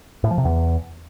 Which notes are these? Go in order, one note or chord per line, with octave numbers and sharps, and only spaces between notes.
A2
F3
C3
E2